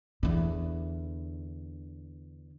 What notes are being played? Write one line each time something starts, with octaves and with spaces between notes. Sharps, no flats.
E2 D3